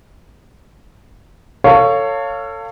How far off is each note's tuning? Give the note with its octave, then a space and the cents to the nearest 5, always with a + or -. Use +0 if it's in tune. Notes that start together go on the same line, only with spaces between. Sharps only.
A4 +30 C#5 +5 F5 +0